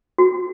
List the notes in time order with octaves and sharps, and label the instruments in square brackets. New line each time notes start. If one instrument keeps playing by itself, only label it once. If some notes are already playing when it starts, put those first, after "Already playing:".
[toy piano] F#4